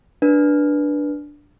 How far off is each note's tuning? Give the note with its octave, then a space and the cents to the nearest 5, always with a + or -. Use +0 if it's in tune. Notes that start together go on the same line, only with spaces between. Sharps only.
D4 +0 B4 -15